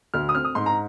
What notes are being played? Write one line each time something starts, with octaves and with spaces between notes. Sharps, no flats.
D2 F6
D#6
C4 F6
D#6
G#2 C6
A#5